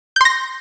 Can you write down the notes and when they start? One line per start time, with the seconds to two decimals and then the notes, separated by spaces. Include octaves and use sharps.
0.16 G6
0.21 C6
0.25 A#6